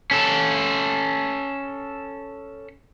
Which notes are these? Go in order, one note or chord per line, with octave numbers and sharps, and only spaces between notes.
C#4 A4